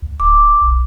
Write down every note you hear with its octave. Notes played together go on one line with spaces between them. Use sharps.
D2
D1 D6
B1